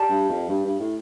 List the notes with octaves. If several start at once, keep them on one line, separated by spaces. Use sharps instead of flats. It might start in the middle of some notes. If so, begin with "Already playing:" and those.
Already playing: G4 D5 A5
G2
F2
G2
G2
A2